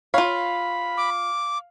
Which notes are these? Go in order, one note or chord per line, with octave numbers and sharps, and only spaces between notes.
F4 C#5 F5 B5
D6